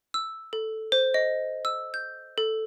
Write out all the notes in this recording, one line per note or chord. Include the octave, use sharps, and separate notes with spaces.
E6
A4
C5
D#5
E6
G6
A4